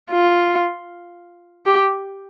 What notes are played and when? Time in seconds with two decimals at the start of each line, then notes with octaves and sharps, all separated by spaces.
0.11 F4
1.66 G4